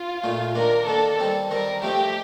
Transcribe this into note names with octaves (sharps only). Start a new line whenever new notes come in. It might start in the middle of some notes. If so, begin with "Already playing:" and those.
Already playing: F4
A#2 A3 D#4
D#3 A#3 D4 A#4
D#3 A#3 D4 A4
D#3 G3 C4
D#3 G3 C4 A#4
F3 A3 C4 D#4 G4